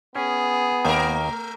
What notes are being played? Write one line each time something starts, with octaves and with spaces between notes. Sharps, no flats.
B3 C#4 G#4
D#2 D#3 A3 A#4